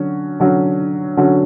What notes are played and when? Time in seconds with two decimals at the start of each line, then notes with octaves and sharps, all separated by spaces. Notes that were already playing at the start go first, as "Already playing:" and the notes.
Already playing: D3 F#3 C#4 F#4
0.40 D3 F#3 C#4 F#4
1.17 D3 F#3 C#4 F#4